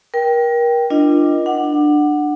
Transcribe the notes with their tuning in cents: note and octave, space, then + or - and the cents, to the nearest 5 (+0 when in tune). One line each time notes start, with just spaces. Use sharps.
A#4 +30 G5 +0
D4 +10 F4 -25 D#5 +0
D4 +20 F#5 +0